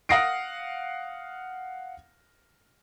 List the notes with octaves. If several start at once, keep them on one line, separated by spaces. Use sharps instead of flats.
F5 F#5 D#6 A#6 C7 D7